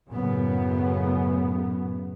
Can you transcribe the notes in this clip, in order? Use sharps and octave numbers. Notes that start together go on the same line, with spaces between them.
F#2 A2 C#3 B3